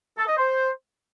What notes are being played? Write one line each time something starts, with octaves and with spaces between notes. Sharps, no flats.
A4
D#5
C5